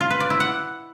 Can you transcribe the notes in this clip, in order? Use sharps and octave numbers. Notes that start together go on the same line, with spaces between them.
F4
B4
D5
E4
F#5